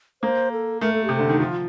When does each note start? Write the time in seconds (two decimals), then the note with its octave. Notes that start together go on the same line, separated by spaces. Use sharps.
0.22 A#3 C5
0.52 A4
0.81 A3 A#4
0.93 A4
1.04 C3 G4
1.16 D3 A4
1.29 D#3
1.40 F3 F4